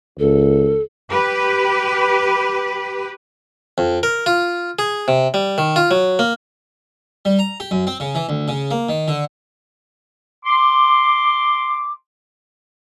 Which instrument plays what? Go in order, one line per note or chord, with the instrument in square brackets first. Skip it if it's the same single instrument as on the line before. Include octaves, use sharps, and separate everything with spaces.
[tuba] C#2 [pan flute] A4
[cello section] G4 B4
[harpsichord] F2
A#4
F4
G#4
C3
G3
D#3
F4
F#3
A#3
G3
A#5
G4
F#2
C4
C#3
E3
D2
C#3
A#3
D#3
D3
[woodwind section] C6 D6